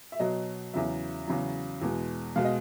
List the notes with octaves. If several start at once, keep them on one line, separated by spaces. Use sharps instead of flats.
E5
B2 F#3 D#5
E2 C#3 F#3 E5
E2 C#3 F#3
E2 B2 G#3
B2 G#3 F5
D#5